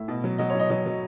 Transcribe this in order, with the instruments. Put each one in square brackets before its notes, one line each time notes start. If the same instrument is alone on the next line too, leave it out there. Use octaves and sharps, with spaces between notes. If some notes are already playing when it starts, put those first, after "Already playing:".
Already playing: [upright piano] A2 E5
B2
F#3
F#3 D#5
F#3 C#5
D#5
F#3 D#5
F#3